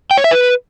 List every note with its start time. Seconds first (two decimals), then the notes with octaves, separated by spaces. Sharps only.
0.11 G5
0.18 C#5
0.24 E5
0.31 B4